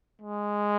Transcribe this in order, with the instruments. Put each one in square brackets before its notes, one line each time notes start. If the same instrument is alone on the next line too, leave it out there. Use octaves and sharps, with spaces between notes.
[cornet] G#3